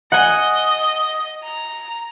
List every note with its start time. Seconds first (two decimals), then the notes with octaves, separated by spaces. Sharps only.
0.12 D#5 F#5 G#5
1.44 A#5